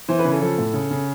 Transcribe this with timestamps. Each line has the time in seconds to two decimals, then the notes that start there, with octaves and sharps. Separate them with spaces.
0.09 E3 C5
0.19 B4
0.25 C#3
0.31 A4
0.41 F3 A4
0.58 A2
0.73 C#3
0.91 C#3